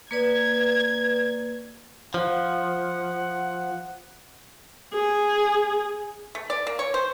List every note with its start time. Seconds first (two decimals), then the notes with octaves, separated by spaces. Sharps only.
0.11 A#3 B4 D5 G#6
2.14 F3 F#5
4.93 G#4
6.35 A3
6.50 D5
6.67 A#3
6.79 C#5
6.94 C5